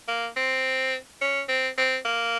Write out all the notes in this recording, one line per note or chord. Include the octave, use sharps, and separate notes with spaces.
A#3
C4
C#4
C4
C4
A#3